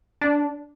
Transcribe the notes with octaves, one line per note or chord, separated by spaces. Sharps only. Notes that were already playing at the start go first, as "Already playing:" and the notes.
D4